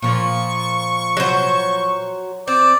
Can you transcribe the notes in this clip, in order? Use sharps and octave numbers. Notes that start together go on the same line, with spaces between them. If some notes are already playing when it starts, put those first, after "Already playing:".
A#2 F3 C#6
F#3 C5
C4 D5